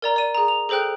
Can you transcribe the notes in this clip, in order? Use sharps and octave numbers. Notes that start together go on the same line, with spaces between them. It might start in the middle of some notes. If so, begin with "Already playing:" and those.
A#4 D5 A#5
D5 D#7
G#4 A#5
F7
G#4 A4 C5 G5 F#6